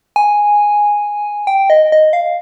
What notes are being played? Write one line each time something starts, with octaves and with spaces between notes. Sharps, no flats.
G#5
G5
D#5
D#5
F5